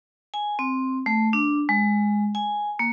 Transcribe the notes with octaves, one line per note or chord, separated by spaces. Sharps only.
G#5
C4
A3
D4
G#3
G#5
A#3